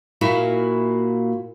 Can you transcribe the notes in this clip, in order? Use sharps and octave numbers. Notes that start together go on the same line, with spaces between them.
A#2 E4 F#4 F5